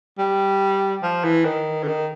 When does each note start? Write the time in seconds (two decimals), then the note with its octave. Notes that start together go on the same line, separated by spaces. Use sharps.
0.18 G3
1.03 F3
1.24 E3
1.45 D#3
1.83 D3
1.87 D#3